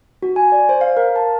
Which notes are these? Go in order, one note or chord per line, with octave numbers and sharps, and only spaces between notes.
F#4
G#5
D5
C5
F5
A#4
A5